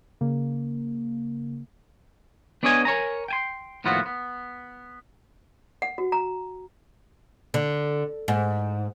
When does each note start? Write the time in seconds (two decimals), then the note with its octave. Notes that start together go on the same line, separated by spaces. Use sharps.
0.21 C#3 A#3
2.63 B3 D4 G#4 C#5 D#5 G#5
2.85 A#4 C#5 G#5 A#5
3.28 G5 G#5 C6
3.84 D#2 A2 F3 B3 F4 F#4
4.06 B3
5.82 F#5
5.98 F#4
6.12 A#5
7.54 D3
8.28 G#2